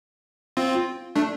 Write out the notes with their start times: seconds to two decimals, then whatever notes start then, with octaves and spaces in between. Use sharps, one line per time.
0.57 C4 F4
1.16 A3 D4